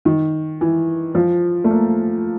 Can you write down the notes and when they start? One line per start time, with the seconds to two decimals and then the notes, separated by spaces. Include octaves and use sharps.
0.05 D#3
0.61 E3
1.15 F3
1.64 A3
1.71 A#3